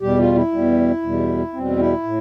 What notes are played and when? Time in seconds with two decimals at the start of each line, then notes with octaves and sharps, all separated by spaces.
0.01 E2 B2 G3 G4
0.19 F4
0.35 E4
0.52 E2 B2 G3
1.02 E2 B2 G3
1.53 E2 B2 G3 C4
1.79 E4
2.03 A2